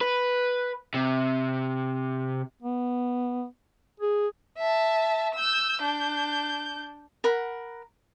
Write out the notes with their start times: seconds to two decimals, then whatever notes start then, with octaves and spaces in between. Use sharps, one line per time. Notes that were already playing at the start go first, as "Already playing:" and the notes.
0.01 B4
0.94 C3
2.62 B3
4.00 G#4
4.58 E5 A5
5.35 E6 G6
5.81 D4 G6
7.24 A#4 F#5 B5